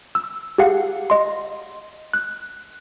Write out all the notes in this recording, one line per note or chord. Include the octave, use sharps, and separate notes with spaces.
E6
G4 G#4 F5 F#5
D#5 C6
F#6